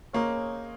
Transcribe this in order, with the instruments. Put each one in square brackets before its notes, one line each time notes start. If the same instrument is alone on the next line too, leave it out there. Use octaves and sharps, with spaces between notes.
[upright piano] A#3 [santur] C#4 G#4 C5 D#5